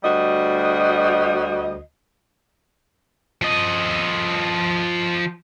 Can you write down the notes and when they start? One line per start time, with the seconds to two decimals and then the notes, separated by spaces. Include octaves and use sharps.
0.04 D2 G3 F#4 D#5
3.42 F3 D#5